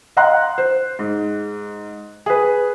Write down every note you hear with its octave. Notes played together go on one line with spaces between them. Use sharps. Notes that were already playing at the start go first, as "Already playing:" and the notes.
D#5 F5 F#5 A#5 C6 F#6
C5
G#2
G#4 B4